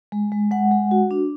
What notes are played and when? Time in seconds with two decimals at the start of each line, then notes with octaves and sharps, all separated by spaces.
0.12 G#3
0.32 G#3
0.51 G#3 F#5
0.72 G#3
0.91 F#4
1.11 D4